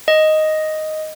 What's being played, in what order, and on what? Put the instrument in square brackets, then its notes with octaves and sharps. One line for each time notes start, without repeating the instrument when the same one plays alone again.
[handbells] D#5